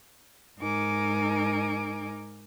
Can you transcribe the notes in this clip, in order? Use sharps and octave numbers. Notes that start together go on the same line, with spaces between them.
G#2 D#4 A#4 G#5 D6